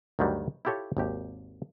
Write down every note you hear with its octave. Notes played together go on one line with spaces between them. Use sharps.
D2 G2 D#3 F#3 G3
E4 F4 G4 A4 C#5
G#1 D#2 G4